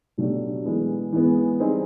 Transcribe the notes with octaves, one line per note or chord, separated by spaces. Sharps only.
B2 F#3 A3 D4 G4
E3 G#3 B3
E3 G#3 B3
G3 C4 D#4 G#4 C5